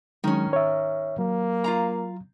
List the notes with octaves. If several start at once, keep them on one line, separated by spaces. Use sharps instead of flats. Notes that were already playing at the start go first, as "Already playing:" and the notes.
D#3 F#3 G#3 C#4
C#5 E5
F#3 A#3
F4 F5 A#5